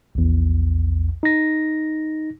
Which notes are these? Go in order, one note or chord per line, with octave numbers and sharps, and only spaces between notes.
A#1 E2
D#4 A#6